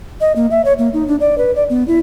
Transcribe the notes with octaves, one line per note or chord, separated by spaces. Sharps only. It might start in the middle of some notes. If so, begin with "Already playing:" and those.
D#5
A#3
E5
C#5
A#3
D#4
D4
D5
B4
D5
B3
E4